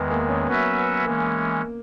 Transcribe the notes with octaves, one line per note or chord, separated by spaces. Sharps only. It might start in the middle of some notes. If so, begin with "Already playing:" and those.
Already playing: E2 D#3 G#3 B3
A#3
C#4
F#3 B3 C#4 F#4 B4 E5
E3 G#3 A#3 C#4